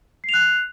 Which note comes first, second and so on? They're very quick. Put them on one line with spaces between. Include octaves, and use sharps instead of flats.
C7 F7 F#6